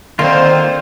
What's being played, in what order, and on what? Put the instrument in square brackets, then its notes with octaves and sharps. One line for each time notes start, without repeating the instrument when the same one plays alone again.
[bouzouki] D3 [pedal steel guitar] D#3 A#3 F4 [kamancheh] C4 C5